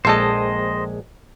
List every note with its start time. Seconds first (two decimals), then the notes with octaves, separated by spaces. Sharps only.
0.05 A#1 G#3 C4 A4 C5 D#5 A5